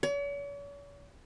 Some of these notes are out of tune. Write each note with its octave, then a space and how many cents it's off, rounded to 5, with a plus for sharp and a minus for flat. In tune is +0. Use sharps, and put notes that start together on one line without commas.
C#5 +45